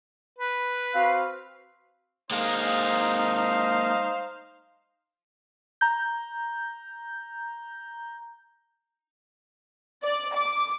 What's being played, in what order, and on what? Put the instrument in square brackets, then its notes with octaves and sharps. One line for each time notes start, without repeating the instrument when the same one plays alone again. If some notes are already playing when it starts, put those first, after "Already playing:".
[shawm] B4
[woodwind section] C4 F#4 F5
[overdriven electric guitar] G#3 A#3 [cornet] D#4 [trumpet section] C5 F5
[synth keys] A#5 G6
[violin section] D5
D6